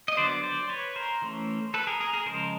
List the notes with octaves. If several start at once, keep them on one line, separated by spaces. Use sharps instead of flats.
D#5
D3 F#3 B3 C5 D5
C5 D5
B4 C#5
A#4 C5
E3 A3 C#4
A4 B4
G#4 A#4
G#4 A#4
G#4 A#4
C#3 F3 G#3 A#4 C5